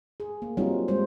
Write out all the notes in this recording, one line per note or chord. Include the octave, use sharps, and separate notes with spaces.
G#4
A#3
F#3 G3 A#3 C4 D#4 F4
G3 G#3 C5